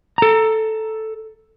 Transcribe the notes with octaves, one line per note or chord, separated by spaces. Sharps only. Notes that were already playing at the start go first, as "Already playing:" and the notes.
A4 A#5